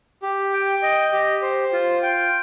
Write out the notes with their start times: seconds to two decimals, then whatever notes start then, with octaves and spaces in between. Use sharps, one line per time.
0.23 G4
0.53 G5
0.82 D#5
1.13 G4
1.42 C5
1.73 F4
2.03 G5